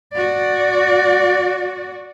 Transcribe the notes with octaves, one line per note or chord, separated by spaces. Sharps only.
F#4 D5